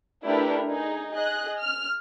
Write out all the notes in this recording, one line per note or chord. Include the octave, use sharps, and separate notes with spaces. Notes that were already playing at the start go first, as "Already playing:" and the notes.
A3 D4 E4 G4 A#4 B4
D#4 G#4
G#4 D#5 F#6
F6